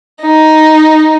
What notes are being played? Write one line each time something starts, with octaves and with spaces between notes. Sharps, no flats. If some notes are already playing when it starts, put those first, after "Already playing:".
D#4